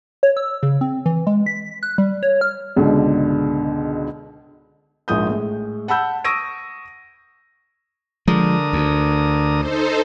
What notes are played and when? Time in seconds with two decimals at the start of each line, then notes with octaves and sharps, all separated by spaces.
0.23 C#5
0.37 E6
0.63 C#3
0.81 C4
1.06 E3
1.27 G#3
1.46 B6
1.83 F#6
1.98 G3
2.23 C#5
2.41 F6
2.76 C#2 G#2 B2 D3
5.08 A#1 G#2 F3 D#6 G6
5.29 A2 G#3
5.88 F#5 A5 B5 E6 G6
6.24 C#6 D#6 E6 A#6 D7 D#7
8.28 D3 F3 G#3 A#4 D#6
8.73 D2
9.57 D#4 A4 C5